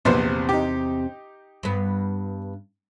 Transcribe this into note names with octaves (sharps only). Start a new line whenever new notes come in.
A#1 E2 C3 B3 C5
D#4 G4
G2 B3